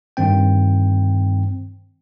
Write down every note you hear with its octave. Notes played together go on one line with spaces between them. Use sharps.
G2 D#3 C4 G5